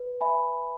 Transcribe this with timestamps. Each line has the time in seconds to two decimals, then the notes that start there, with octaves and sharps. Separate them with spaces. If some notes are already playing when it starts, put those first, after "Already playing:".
Already playing: B4
0.21 E5 G#5 B5